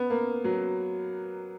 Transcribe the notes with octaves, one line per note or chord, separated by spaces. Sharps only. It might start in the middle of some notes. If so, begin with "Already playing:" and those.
Already playing: B3
A#3
F#3